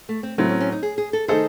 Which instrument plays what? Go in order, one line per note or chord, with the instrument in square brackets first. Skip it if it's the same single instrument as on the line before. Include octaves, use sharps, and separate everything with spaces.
[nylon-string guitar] A3
C4
[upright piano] A2 F#3 C4 [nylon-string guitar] A3
[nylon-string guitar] C#4
C#4
D#4
G#4
G#4
A4
[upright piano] D#3 A3 D#4 A4 C5 [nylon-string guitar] G#4